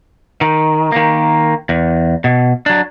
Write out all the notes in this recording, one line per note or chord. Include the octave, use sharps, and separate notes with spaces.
D#3
D#3 A#3
E2
B2
F#3 D4